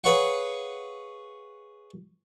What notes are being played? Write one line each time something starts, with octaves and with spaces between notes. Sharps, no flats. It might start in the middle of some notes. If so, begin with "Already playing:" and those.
G#4 B4 C#5 F5 F#5